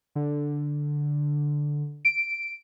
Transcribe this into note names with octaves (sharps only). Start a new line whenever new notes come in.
D3
D7